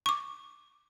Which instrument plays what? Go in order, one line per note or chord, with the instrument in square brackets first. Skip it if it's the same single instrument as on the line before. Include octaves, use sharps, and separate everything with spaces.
[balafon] C#6 D6